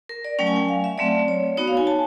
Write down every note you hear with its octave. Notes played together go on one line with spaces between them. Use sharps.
A#4
D5
F#3 A3 C#4 G5
G#5
G5
F5
E5
F#3 A3 C4 D5
C#5
B3 D#4 F#4 C#5
F5
G#5
A5